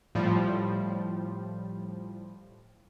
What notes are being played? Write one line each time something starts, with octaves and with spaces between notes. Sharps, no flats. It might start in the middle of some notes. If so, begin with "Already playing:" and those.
A2 F3 G3